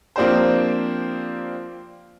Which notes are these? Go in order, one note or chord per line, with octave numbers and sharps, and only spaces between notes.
F3 A#3 C4 D4 G4 C5